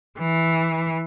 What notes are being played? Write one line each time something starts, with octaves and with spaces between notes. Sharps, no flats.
E3